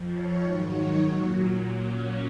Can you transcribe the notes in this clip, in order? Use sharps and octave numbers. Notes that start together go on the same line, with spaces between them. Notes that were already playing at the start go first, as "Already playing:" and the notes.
Already playing: F2 F3
C#5
G#2 D#3 F#3
C#5
A#2 F#3
A#2 F#3
C#4